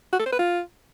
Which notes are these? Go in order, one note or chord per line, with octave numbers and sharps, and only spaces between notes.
F#4
A4
C5
B4
F4